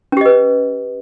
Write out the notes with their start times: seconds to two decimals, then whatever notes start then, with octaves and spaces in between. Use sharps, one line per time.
0.12 C#4
0.17 G4
0.21 D#5
0.26 B4